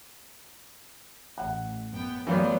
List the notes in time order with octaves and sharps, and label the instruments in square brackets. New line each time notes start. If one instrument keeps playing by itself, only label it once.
[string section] A1 [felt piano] F#5
[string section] F#2 B3 G5
[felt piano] F#2 F5 [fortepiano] E3 G3 B3 [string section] F#3 A3